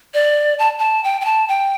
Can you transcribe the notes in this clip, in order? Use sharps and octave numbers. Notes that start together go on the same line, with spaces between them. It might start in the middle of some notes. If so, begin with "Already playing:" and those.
D5
A5
A5
G5
G5
A5
G5